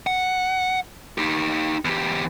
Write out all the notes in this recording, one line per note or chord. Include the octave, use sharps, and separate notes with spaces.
F#5
D#4 G4
E2 G4